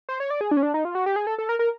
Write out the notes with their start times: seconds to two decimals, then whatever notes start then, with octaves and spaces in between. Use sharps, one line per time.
0.09 C5
0.20 C#5
0.30 D5
0.41 G#4
0.51 D4
0.57 C#4
0.63 D4
0.74 D#4
0.85 F4
0.95 F#4
1.06 G4
1.16 G#4
1.27 A4
1.38 A4
1.49 A#4
1.59 A#4